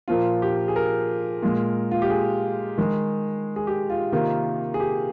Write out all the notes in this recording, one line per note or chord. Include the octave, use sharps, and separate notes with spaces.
A#2 F3 A#3 F4
G4
G#4
A#4
A#2 G#3
F4
G4
G#4
D#3 G#3
G#4
G4
F4
C3 D#3 A#3 F4
G#4
G4